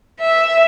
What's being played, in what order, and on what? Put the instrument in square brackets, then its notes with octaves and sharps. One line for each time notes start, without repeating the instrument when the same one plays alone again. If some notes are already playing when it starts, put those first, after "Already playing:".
[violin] E5